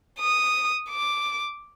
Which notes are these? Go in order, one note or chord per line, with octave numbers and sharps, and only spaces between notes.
D#6
D6